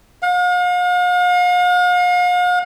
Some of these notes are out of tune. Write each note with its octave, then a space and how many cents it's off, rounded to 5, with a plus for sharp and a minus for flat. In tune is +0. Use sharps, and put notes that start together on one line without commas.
F5 +45